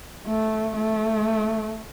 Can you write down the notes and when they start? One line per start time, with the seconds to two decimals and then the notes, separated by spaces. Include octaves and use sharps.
0.27 A3
0.77 A3